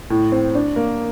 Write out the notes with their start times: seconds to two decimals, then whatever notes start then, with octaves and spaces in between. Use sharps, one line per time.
0.10 A2
0.32 C4
0.55 D4
0.76 A#3